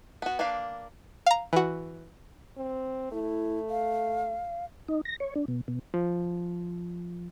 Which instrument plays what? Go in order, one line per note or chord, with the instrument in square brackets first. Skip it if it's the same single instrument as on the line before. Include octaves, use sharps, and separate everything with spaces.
[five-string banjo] B3 F#4
A#3 D4 B4 F5
[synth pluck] F5 A#5
E3 F#4
[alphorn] C4
[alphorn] A3 [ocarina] E4
[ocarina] F5
[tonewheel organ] D#4
A#6
C#5
D4
B2
B2
[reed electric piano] F3